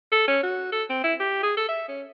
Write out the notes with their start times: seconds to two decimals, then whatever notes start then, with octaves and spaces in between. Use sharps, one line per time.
0.12 A4
0.28 C#4
0.44 F#4
0.72 A4
0.90 C4
1.04 E4
1.20 G4
1.43 G#4
1.57 A4
1.69 E5
1.88 C#4